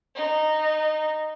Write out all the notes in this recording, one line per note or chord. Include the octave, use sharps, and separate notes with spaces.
D#4